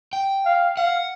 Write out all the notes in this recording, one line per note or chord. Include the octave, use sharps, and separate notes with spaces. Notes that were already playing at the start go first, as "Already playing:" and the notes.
G5
F5
F5 F#5